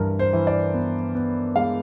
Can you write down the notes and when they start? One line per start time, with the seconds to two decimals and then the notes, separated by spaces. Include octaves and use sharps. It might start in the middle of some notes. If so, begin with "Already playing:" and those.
Already playing: G2 E3 A#4
0.19 C5
0.33 E3
0.47 D5
0.74 B3
1.15 B3
1.56 G#3 F5